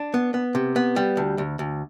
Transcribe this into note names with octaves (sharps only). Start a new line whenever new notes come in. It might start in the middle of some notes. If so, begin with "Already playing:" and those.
Already playing: D4
B3
B3
C3
B3
G3
D2
D2
D2